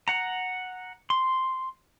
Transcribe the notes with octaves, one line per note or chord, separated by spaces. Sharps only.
F#5 A#5
C6